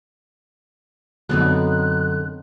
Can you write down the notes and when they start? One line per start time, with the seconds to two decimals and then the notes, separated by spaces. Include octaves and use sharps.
1.29 F#2 D3 B3 C4 D#4 F#6